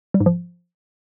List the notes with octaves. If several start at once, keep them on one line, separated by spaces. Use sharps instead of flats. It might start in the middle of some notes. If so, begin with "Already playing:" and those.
G3
G#2
F3